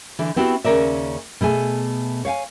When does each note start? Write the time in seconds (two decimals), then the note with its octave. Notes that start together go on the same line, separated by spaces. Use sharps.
0.19 D3 E3
0.36 B3 C4 E4 F#4 G4
0.64 D#2 C#3 C#4 A#4 D5 E5
1.41 B2 A3 G#4 G#5
2.25 C#5 F5 G5 G#5